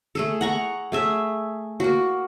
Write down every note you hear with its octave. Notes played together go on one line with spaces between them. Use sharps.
A3 G#4 A4
F#5 A#5 C#6
A3 G#4 E5
A#3 F#4